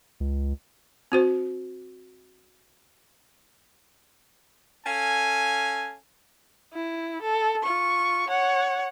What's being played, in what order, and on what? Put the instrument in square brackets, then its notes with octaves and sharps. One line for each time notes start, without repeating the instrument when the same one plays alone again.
[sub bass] C#2
[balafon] C4 F#4 C5
[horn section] C#4 A4 F5 G#5
[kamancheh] E4
A4
F4 C#6
C#5 F#5